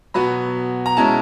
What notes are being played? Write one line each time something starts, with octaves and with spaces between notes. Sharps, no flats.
B2 F#3 B3 B5
A#5
B2 G#3 C#4 E4 A5